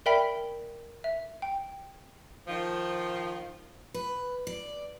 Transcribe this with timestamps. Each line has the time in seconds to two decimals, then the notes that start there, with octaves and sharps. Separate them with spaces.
0.06 A#4 D5 E5 G5 B5 B6
1.04 E5
1.42 G5
2.47 D#3 F3
3.94 B4
4.47 D5